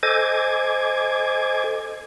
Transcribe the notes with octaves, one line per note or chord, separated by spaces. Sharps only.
A4 C5 D#5 G#5 D6 G#6